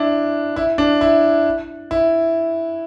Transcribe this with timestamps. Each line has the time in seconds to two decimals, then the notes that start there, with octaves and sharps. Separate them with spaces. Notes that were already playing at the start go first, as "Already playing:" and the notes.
Already playing: D4 E4
0.56 E4
0.78 D4
1.01 E4
1.91 E4